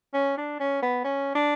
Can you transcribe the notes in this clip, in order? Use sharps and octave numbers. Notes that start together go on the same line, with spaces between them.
C#4
D4
C#4
B3
C#4
D4